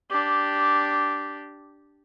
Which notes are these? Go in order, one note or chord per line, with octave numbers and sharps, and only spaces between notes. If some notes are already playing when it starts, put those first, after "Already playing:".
D4 G4